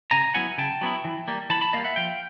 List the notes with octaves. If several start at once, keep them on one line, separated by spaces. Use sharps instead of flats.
C#3 G#5 A#5
F#3 B3 E4 F#5 G#5
C#3 G5 A5
F#3 B3 E4
E3
G3 A#3
E3 A5 B5
A5 B5
G3 A#3 D#5 F5
E5 F#5
F3 F5 G5